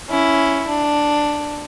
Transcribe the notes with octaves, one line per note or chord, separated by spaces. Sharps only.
C#4 E4
D4